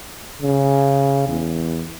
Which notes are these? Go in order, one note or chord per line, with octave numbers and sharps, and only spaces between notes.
C#3
E2